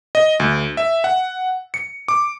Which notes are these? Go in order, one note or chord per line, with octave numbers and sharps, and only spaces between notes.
D#5
D2
E5
F#5
C#7
D6